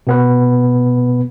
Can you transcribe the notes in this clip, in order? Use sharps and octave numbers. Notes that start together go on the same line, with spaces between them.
B2 B3 B4